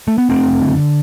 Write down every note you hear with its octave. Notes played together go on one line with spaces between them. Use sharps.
A3
B3
F#1 A3 C4
D3